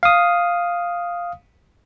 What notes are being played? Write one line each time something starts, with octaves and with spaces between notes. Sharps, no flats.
F5 D#6